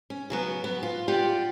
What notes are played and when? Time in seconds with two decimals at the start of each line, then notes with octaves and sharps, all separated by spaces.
0.10 C#4
0.30 C#3 F#3 B3
0.64 B3
0.83 F4
1.08 F4 G4 D5 F#5